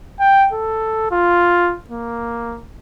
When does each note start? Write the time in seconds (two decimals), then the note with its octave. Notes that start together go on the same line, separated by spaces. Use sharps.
0.20 G5
0.53 A4
1.11 F4
1.90 A#3